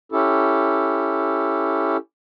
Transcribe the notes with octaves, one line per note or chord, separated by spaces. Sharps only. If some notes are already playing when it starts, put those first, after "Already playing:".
C#4 E4 G4 A4